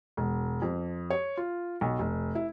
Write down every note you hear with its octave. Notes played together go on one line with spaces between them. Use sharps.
E1
F2
C#5
F4
B1
F1
E4